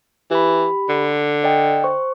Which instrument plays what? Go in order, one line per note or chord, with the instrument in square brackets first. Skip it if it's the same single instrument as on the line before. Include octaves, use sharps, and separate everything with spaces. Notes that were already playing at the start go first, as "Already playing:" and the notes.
[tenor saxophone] E3 [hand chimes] G4 B5
[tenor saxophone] D3
[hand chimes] D5 D#5 G5
C5 C#6